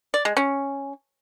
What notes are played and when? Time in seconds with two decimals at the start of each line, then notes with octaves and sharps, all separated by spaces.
0.14 D5
0.25 G#3
0.37 C#4